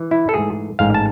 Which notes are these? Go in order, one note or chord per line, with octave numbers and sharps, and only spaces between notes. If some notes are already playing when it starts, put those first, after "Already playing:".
Already playing: E3
E4
A4
G#2 E3 A3 G#4
A1 G#2 G#3 F5
A5